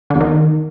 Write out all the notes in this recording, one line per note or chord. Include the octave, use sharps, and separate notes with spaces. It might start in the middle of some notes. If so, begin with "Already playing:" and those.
D3
E2
D#3